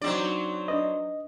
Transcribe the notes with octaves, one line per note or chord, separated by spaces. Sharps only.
F#3 C4 D4 D#4 D5
D4 B4 D#5